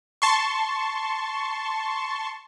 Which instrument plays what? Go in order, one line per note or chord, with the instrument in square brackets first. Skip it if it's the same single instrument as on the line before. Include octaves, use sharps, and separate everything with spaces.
[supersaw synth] A5 C6 C#6